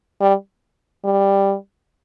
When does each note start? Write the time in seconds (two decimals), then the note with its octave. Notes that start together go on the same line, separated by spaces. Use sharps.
0.21 G3
1.04 G3